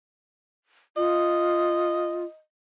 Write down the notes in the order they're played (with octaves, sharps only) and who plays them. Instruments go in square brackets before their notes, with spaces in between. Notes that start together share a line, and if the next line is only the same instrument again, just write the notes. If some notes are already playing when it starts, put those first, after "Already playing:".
[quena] F4 [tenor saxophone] D#5